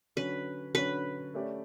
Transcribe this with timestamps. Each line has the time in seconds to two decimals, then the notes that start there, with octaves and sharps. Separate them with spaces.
0.16 D3 F#3 C#4 B4
0.75 D3 F#3 C#4 B4
1.34 A3 C#4 G4 D5